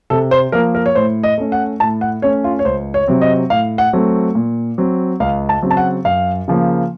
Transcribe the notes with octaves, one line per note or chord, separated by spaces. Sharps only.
C3 A4
C5
F3 A#3 A#4
A#4
C#5
A2 C5
D#5
A3 C#4
F#5
A2 A5
F#5
A3 C#4 C#5
F4
C#5
C#2 C5
C#5
C3 F#3 C4
D#5
A2 F5
F#5
F#3 A3 C4
A#2
F#3 C4
C#2 F5
A5
C#3 F#3 C4
A5
F#5
F#2 F5
C#3 F3 A#3